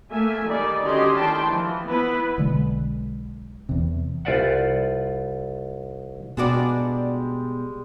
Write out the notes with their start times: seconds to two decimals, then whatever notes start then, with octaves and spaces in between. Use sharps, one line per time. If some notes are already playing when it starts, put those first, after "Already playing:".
0.11 A3 A#3 E5 G#5
0.46 D#3 G3 D#4 D5
0.83 D3 C#4 F#4 G4 D#5 C6
1.18 D#3 D4 E4 G5 A5 C6
1.47 E3 F3
1.84 B3 E4 B4
2.38 B1 D3 G#3
3.69 E2 C3
4.25 C2 F4 B4 D5 E5 F#5
6.37 B2 G3 G#3 D4 F#4 D5